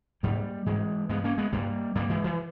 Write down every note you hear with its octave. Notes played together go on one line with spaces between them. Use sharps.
G#2 G3 A#3
G#2 E3 G#3
G2 G#3 B3
A#3 C#4
G#3 B3
G2 G3 A#3
G2 G3 A#3
E3 G#3
E3